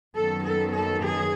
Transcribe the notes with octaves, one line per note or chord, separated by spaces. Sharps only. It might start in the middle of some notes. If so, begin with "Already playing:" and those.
F#2 D#3 F#3 B3 A4
A4
A4
G#4